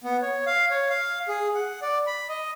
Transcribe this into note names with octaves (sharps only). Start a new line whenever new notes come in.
B3
C#5
F5
C#5
F5
G#4
F#5
D5
B5
D#5